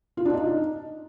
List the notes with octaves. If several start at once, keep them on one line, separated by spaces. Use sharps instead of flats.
F4
D4
D#4